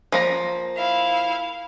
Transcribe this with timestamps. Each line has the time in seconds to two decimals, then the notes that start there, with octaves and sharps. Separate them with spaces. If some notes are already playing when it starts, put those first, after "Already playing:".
0.12 F3 A#3 A#5
0.76 E4 F5